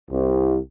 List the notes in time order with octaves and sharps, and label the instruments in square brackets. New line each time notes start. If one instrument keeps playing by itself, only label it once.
[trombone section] C2